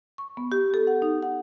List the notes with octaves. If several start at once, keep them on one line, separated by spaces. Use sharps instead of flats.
C#6
B3
G4
A4
F#5
D#4
F#5